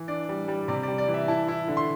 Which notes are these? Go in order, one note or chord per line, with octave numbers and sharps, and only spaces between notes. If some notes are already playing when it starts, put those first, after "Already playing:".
Already playing: E3
D4 D5
G3
G3
C3 D5
D5
G3
D5
E3
E5
E4 A5
E4
D3
C6